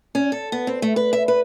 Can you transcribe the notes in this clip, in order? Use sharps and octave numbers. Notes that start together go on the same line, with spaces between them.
C#4
A4
B3
C4
A3
B4
E5
B4